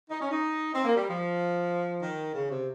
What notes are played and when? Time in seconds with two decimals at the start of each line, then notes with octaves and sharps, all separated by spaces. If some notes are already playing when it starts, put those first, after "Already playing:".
0.10 D#4
0.20 C#4
0.31 D#4
0.74 C4
0.85 A#3
0.96 G3
1.07 F3
2.02 D#3
2.35 C#3
2.51 C3